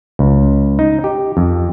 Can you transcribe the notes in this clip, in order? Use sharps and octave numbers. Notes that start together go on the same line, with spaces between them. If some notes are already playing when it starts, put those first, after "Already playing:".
C#2
D#4
G4
F2